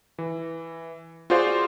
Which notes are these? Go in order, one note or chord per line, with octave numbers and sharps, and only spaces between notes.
E3
F4 F#4 G#4 C5 D5 F5